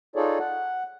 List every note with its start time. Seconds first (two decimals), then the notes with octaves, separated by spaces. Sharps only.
0.16 D#4 F4 G#4 A4 C#5 D5
0.40 F#5